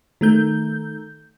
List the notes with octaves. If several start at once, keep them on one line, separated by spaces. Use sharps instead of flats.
D#3 A3 G6